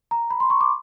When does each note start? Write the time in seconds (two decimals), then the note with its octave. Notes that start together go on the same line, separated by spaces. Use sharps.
0.11 A#5
0.30 B5
0.40 C6
0.50 C#6
0.61 D6